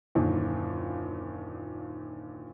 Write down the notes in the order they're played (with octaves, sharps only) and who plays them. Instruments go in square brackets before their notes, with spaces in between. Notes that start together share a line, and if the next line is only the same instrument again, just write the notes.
[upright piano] F#1 D#2 A#2 D3 D#3